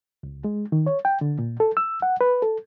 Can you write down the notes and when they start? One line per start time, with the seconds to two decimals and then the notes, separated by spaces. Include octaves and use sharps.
0.23 C#2
0.44 G#3
0.72 D#3
0.87 C#5
1.05 G5
1.21 D3
1.39 A#2
1.60 A4
1.77 E6
2.02 F#5
2.21 B4
2.42 A4